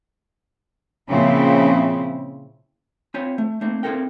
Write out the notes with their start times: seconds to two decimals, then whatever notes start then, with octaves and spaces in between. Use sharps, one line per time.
1.10 A#2 C#3 F3 C4 E4
3.14 C4 F4 C5 C#5 G#5 B5
3.38 A3
3.61 A3 A#3 C4 D#4
3.83 C4 E4 A4 A#4 G5